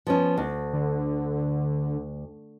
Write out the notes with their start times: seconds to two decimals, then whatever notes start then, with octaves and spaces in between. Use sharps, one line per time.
0.07 F3 B3 C#4
0.38 D2
0.73 D3